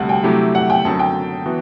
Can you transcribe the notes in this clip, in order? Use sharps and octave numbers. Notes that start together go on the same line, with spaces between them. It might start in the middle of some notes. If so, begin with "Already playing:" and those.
Already playing: D2 C3 G3 F#5 A5
G5
C3 F#3 A3 E4 G4
F#5
G5
F#2 D3 F#3 C4 A5
G5
E3 B3 F#4